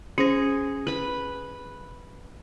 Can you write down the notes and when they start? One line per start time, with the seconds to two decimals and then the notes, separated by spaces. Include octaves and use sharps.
0.18 C#4 G#4 C5 A#6
0.87 B4 B5